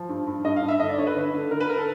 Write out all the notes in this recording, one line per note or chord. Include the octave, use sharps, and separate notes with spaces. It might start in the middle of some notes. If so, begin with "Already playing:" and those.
Already playing: F3
G2
G2
G2 D#5
F5
G2
E5
D3 D#5
D5
D3 C#5
B4
D3
D3
D3 A#4
B4
A#4
A4